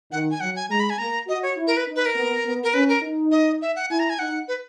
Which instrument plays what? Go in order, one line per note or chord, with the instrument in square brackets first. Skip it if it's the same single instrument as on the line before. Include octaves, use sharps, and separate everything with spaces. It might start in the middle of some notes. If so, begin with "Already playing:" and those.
[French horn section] D#3 [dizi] F#5
[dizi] G#5
[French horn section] F#3 [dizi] F#5
[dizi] G#5
[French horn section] G#3 [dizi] A#5
[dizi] B5
G#5
[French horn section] A#3 [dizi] A#5
[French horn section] F#4 [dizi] D#5
[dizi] C#5
[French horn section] E4
[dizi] A#4
B4
[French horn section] D#4
[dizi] B4
A#4
[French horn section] B3
B3
[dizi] A#4
[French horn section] C#4 [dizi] B4
[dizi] A#4
[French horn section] D#4
[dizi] D#5
E5
F#5
[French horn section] E4 [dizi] G#5
[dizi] A#5
G#5
[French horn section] D#4 [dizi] F#5
[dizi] B4